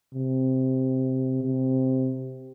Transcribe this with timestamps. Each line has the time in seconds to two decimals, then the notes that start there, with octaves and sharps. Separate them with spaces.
0.14 C3
1.42 C3